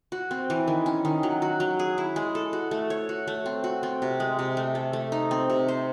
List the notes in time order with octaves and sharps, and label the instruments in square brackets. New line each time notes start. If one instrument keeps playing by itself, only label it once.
[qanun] F#4
C4
E3
D#3
C#4
D#3
F#3
F#4
F#3
G#4
E4
G#3
A4
F#4
A3
C#5
F#4
A3
C4
F#4
C4
C3
G#3
C3
A3
A4
A3
D#4
C4
C3
C5